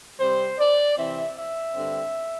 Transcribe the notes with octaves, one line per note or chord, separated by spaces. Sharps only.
C3 G3 C4 C5
D5
C3 E3 C4 E5
E5
G2 D3 C4